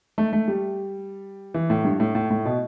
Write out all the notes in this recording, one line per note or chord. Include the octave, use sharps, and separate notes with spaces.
A3
A3
G3
E3
A2
G2
A2
A2
A2
B2